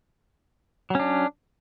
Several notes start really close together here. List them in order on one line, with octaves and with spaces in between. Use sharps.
F#3 C#4 D4